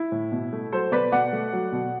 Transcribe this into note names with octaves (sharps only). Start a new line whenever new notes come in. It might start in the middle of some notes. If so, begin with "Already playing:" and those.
Already playing: E4
A2
B2
A3
F#3 A4 C5
B2 B4 D5
B2 D5 F#5
A3
F#3
B2